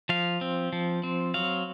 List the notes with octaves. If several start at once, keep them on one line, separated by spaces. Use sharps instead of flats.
F3 F5
C4
F3
C4
F#3 F5